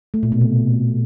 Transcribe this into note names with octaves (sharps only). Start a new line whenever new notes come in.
A3
A#2
B2
C3